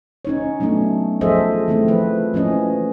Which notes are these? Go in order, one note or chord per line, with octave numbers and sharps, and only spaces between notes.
C#4 D#4 C#5
F#3 A3 B3 C#4 D4
F3 G#4 A4 C5 D#5 E5
E3 A3 C4
F3 B4
E3 F3 A#3 C#4 D#5